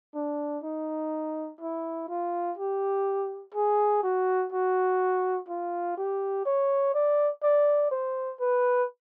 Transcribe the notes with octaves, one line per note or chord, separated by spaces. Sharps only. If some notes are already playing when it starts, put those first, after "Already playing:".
D4
D#4
E4
F4
G4
G#4
F#4
F#4
F4
G4
C#5
D5
D5
C5
B4